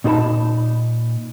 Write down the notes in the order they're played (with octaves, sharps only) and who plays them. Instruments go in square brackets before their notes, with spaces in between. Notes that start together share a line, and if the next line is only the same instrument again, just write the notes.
[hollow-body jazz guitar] A#2 D#4 F4 C5 A5 B5